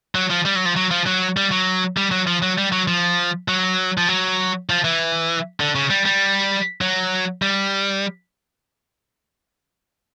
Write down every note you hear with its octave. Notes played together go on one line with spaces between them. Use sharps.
F#3
F3
G3
F#3
F3
F#3
F3
F#3
G3
F#3
G3
F#3
F3
F#3
G3
F#3
F3
F#3
F3
F#3
F3
E3
D3
C#3
G3
G3
F#3
G3